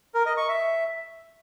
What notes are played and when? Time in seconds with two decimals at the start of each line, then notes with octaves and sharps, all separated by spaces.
0.14 A#4
0.26 D#5
0.37 C#6
0.48 E5